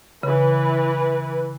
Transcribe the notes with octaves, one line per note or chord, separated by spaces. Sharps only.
C#3 E3 B4